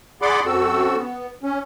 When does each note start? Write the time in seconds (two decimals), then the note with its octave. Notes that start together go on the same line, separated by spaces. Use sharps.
0.22 G#4 D5 F#5 B5 C6 D6
0.46 F#2 C4 F#4 A4 E6
0.97 B3
1.43 C#4